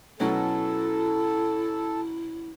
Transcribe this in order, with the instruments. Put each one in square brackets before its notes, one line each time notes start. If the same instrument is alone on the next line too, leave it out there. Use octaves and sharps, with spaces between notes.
[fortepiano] B2 F#3 C#4 [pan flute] E4 [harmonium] A4